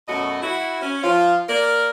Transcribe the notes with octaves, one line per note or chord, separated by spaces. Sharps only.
F#2 B2 F#3 A3 F#4 D#5
E4 F#4
C#4
F3 F4
A#3 A#4 D5